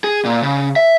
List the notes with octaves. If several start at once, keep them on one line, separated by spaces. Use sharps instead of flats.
G#4
A#2
C#3
E5